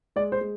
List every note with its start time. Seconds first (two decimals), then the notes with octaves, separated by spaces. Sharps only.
0.16 G#3 D5
0.32 C5
0.41 G#3